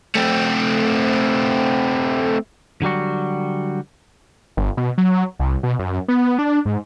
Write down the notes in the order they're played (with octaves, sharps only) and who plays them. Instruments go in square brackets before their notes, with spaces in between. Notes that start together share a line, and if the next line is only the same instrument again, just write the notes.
[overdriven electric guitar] A3 C4
[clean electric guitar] D3 F#3 G3 F#4
[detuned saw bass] G1
B2
F#3
C2
B2
F#2
B3
D4
G#2